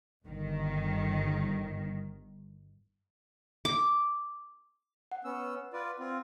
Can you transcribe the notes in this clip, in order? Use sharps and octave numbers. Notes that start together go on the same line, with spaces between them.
G1 D#3
D6
F#5
B3 C#4 E6
F4 B4 D5
C4 F4